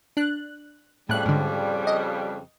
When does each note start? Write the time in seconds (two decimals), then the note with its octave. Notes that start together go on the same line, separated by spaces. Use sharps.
0.17 D4 F#6
1.09 F2 A2 C#3 G3 F#6
1.25 G#2 D3
1.87 D#5